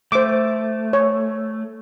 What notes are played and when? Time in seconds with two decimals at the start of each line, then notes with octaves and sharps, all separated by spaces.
0.12 A3 C5 D6
0.93 C#5